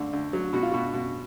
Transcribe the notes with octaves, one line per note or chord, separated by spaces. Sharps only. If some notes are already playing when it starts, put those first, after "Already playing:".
Already playing: D2 D3
D2
F#3
B2 F#4
F4
B2 F#4
B2